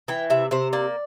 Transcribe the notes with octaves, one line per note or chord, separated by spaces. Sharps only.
E3 G5
C3 E5
C3 C5
A#3 D5